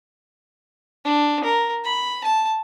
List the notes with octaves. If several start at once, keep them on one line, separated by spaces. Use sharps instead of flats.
D4
A#4
B5
A5